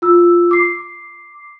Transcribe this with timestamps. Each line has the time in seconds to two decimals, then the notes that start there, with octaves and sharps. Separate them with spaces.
0.02 F4 E6
0.51 D6 C7